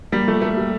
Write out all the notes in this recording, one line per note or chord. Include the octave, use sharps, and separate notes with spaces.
G3 A#3
F3 A3
A3 A#3
G3